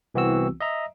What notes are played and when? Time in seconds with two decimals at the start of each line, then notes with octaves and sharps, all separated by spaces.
0.14 C2 E3 B3 C4 F#4 E6
0.60 D#5 E5 A#5